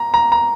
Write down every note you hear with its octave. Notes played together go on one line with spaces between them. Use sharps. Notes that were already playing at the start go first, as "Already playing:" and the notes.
Already playing: A#5
A#5
A#5